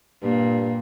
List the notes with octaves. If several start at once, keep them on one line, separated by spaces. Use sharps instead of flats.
G2 A#2